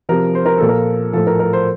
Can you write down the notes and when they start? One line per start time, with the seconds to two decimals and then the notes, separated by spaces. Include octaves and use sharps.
0.09 C3 F3 A#4
0.35 C5
0.46 A#4
0.58 A#2 F3 A4
0.69 A#4
1.13 A2 F3 A4
1.27 A#4
1.40 A#4
1.53 C5